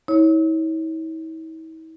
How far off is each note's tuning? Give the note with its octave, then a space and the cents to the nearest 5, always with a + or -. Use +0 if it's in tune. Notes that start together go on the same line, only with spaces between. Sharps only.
E4 -45 C#5 +0